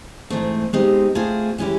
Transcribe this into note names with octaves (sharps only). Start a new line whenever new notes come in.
G#2 E3 A3 C4
B2 G#3 C4 D#4 G4
A3 C4 F4 G#4 C5
E3 G#3 C#4 E4 G4